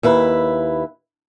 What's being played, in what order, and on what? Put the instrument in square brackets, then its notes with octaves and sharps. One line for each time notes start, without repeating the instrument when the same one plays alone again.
[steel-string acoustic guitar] D#2 E4 B4